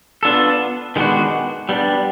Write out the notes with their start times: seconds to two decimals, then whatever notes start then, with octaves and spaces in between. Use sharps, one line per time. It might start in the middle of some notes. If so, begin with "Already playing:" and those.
0.23 B3 D4 F4 A4
0.96 D#3 G#3 B3 D4 F#4
1.69 G3 B3 D4